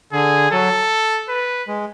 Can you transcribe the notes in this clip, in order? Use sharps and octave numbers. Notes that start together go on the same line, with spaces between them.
D3 G#4
F#3 A4
B4
G#3